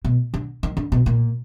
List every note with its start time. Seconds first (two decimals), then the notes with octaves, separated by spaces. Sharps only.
0.05 B2
0.34 D3
0.63 D#3
0.77 D3
0.92 B2
1.06 A#2